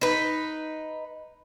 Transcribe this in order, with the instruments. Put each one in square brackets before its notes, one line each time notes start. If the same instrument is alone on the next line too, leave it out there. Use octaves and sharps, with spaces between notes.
[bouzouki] D#4 B4